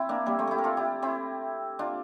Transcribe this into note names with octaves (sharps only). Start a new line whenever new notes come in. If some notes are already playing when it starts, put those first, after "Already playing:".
Already playing: C4 E4
A#3 D4
G3 A#3
A3 C4
E4 G4 A4
A#4
F4 A4
E4 G4
C4 E4
D4 F4